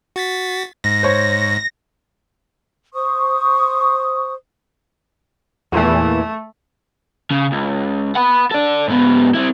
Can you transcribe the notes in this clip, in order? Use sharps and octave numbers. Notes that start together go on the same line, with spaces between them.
F#4 A6 B6
G#2 A#6
C5 C#5
C5 C#6 D#6
E2 A#2 E3 A3
C#3
C#2
F#5 B5
A4 D5
G#2 B3
C4 E4